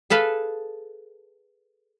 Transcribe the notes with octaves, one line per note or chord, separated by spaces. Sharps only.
G#4 A4 B4 F5